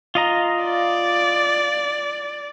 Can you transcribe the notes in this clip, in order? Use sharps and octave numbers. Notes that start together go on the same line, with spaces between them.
F4 D#5 A#5
D5